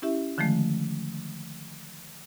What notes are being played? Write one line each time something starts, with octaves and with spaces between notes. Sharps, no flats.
C#4 E4 G4 E5
D3 D#3 F3 G#3 A3